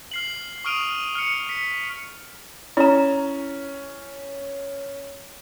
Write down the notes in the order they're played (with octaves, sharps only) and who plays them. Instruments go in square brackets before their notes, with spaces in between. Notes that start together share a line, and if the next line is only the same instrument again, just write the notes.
[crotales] F6 C7 F#7
C#6 D#6 F6 D7 D#7 F7
F6 C#7
B6 C#7
[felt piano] C#4 [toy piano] E4 A#5